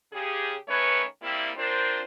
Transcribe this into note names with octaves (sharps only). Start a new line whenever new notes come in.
C#3 G4 G#4
D#3 A3 C#4 B4 C#5
G3 A#3 C4 E4
C4 D4 F4 A#4 C5